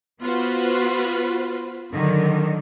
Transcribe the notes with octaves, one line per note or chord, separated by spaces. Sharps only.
B3 F4 F#4 B4 C5
D3 D#3 F#3